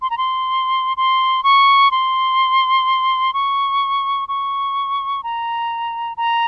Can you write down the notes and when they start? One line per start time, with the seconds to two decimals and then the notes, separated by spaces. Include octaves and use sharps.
0.02 C6
0.10 A#5
0.18 C6
0.97 C6
1.43 C#6
1.91 C6
3.34 C#6
4.28 C#6
5.23 A#5
6.17 A#5